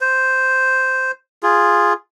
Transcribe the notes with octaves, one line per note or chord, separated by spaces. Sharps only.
C5
F4 G#4